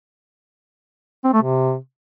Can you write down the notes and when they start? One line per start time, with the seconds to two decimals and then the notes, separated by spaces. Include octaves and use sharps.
1.24 C4
1.33 A3
1.42 C3